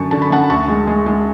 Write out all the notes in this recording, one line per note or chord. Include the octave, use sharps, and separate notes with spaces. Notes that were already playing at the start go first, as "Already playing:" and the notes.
Already playing: F#2 D3 A5 C#6
D3 A5
B5
F#2 F#5 A5
D2 A5 C#6
G#3
G#3
G#3